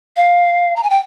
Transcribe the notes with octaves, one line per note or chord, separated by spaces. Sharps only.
F5
A#5
G#5
G5